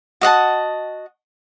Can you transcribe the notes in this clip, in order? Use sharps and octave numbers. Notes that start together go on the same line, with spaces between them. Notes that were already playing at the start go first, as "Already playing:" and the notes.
F#4 D#5 F#5 A5